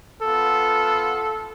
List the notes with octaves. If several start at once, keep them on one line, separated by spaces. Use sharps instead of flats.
B3 F4 A4